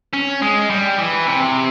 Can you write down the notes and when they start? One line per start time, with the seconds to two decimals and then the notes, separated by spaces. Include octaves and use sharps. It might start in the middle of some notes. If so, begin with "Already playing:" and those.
0.14 C#4
0.42 G#3
0.70 G3
0.99 E3
1.27 C3